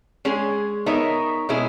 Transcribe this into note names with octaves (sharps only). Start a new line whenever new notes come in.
G#3 C#4 G#4
B3 D#4 A#4 C#5 E5
B2 G#3 C#4 E4 G#4